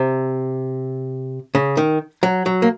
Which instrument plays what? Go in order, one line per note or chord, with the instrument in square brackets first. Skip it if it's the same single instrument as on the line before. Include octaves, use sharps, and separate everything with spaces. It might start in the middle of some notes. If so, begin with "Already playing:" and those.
Already playing: [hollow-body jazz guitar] C3
C#3
D#3
F#3
F#3
A#3